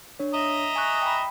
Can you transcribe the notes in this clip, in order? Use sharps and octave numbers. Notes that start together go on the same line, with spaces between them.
D4 C#5
D#5 E5 A#5
G#5 C#6 F#6
G5 B5